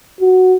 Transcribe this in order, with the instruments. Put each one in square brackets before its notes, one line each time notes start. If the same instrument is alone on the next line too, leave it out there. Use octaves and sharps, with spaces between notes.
[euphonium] F#4